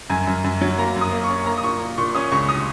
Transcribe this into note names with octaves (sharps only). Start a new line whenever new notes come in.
F#2 G#5
F#2
F#2
F#3
A#3 A#5
F#2
D#6
A#3
C#6
C#4
A#3 A#5
D#6
A#2 C#6
A#3
A#2 C#6
C#4 D#6
C#2 C#6
D#6